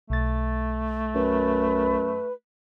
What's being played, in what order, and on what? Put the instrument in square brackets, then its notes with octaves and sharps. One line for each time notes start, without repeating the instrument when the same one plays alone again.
[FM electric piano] B1 A6 [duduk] A3
[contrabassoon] F#2 [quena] B4